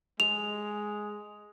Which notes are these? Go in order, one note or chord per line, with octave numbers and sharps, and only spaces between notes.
G#3 F7